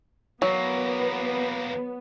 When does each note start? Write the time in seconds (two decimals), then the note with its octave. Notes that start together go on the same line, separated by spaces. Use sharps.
0.42 E2 F#3 A#3 B3